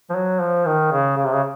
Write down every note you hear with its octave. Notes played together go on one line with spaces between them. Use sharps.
F3
F#3
F3
D#3
C#3
C#3
C3
C#3